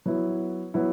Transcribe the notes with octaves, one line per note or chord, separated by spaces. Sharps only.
F#3 B3 E4
F#3 B3 E4